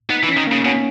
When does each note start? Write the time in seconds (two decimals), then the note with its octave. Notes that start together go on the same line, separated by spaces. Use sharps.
0.09 B3 D#4
0.23 E3
0.29 C#4
0.37 D#3
0.47 C#3 A#3
0.65 B2 C#4